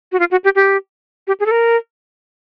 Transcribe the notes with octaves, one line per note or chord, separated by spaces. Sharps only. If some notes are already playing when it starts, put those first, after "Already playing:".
F#4
F4
F#4
G4
G4
G4
G#4
A4
A#4